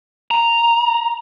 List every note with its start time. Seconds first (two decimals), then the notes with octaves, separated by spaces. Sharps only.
0.31 A#5